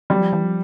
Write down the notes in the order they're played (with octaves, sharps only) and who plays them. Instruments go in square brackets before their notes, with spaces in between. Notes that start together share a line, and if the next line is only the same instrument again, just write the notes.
[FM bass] F#3 [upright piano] G3
[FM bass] F3
E3
F3